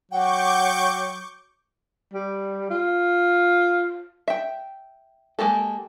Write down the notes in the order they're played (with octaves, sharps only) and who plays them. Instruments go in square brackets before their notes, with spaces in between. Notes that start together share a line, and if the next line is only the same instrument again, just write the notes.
[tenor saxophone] F#3 [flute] F#5 [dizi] G5 [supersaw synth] C#6 D6 G6
[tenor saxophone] G3
F4
[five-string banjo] E5 G5
G#3 A#3 G4 A4